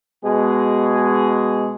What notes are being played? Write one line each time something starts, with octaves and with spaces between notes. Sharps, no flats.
B2 G#3 G#4